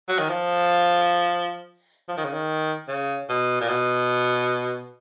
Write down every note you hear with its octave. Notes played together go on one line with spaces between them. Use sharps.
F#3
D#3
F3
F3
D#3
C#3
D#3
C#3
B2
A#2
B2